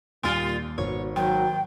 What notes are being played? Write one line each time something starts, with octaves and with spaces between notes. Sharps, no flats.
D#2 A#2 G3 F4
G#1 B2 C#5
D#2 F#3 G5